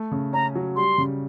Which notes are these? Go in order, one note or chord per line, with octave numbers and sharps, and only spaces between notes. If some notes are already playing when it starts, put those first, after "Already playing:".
Already playing: A3
C#3
C#4 A#5
F#3
G3 C6
C#3